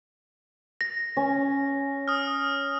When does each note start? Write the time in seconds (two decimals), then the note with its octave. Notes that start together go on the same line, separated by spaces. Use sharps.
0.81 A#6
1.17 C#4
2.08 D#6 F6